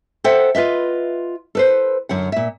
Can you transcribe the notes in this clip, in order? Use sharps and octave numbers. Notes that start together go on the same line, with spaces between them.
A4 C5 E5 F#5 G5
F4 B4 D#5 E5
A4 B4 C5
F#2 D3 F#5
A#2 E5